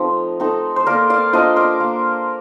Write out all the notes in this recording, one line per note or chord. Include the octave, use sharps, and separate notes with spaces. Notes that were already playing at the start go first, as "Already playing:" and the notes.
Already playing: F3 A3 C4 D#4
A3 C4 D#4
C5
A#3 A#4 D5
D5 F5
D4 F4 C5 D#5
A#4 D5
A#3